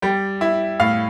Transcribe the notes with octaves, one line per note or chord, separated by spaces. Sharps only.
G3 G5
E4
A2 F5